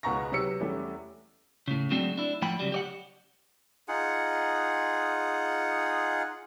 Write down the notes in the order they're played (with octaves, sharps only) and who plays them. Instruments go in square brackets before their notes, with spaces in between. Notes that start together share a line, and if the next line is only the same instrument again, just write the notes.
[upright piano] C#2 B2 F#5 A#5 C#6 A#6
C3 F#3 B4 E6 C#7
E2 G3 A3 C#4
[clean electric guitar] A2 C#3
F#3 G#3 A3 C4 D4 F#4
D4 E4
A2 F3 A3 F#5 G5 B5
C#3 F#3 G3
G4 D5 F#5
[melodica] D#4 F4 G#4 F#5